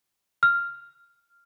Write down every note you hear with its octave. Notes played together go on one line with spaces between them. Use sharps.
F6